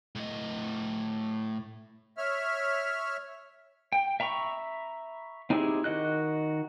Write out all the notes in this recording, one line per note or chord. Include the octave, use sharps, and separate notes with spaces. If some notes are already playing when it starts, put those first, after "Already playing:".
A2 D#5
C#5 E5 F6
G5
E5 A#5 B5 C#6
C4 D#4 E4 G4 G#4
D#3 F#4 D#5 F#6